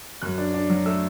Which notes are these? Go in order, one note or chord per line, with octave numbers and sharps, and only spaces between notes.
F#2 F#6
D4
D4
F#3
A3 E6